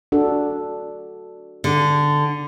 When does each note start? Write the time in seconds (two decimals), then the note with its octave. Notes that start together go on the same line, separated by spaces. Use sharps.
0.12 D4 F#4 A4
1.64 D3